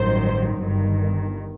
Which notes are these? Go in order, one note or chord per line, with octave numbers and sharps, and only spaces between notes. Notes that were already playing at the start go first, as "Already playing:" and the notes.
Already playing: A1 G2 D#3 F#3 C5
G1 G2 D#3